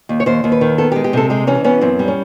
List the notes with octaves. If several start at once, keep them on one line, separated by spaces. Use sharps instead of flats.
D#2
C#5
D#2 C5
D#2
B4
D#3
B3 A4
G4
G#3
G4
C3 A4
G#3 G4
E3 C#4
B3 C#4
F#2 C4
G3
C#4